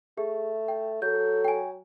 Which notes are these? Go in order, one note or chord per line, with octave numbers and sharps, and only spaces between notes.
A3 G#4
G5
F#3 A4 G6
G5 G#5